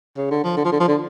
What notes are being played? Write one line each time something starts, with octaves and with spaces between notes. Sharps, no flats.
C#3
D3
F3
D3
F3
D3
F3
D3